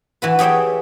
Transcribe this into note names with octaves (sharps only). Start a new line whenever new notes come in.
E3 F#4 B4
G4 G#4 C#5 E5 G5